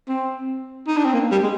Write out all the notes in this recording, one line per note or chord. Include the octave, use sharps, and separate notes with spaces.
C4
D#4
D4
C4
A#3
G3
G#3